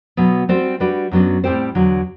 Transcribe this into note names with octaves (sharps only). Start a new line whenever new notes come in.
B2 F#3 B3
G3 C4 F#4 C5
G3 D4 F#4 B4
F#2 F#3 B3 D4
A2 G3 C4 G4 C5
E2 D3 F#3